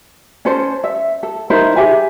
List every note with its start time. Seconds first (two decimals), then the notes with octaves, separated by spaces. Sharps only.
0.45 C#4 A4 C5
0.84 E5
1.23 A4
1.50 D#4 E4 A#4 C5
1.76 G4 G#4 E5 G#5